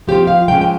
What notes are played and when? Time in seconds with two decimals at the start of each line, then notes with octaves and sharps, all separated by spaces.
0.07 F3 C4 F4 G4
0.27 F5
0.48 F3 G#3 C#4 G5
0.61 G5